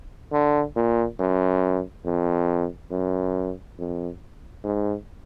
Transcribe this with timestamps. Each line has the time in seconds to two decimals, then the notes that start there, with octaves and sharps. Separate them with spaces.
0.32 D3
0.76 A#2
1.19 F#2
2.05 F2
2.91 F#2
3.79 F2
4.64 G#2